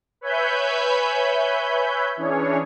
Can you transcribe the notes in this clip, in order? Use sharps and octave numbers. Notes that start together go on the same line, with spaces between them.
B4 C#5 E5 G#5 B5 G6
E3 C#4 D4 G#4 C#5